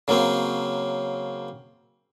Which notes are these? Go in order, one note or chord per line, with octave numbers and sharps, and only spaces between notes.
C#3 F#3 A#3 C4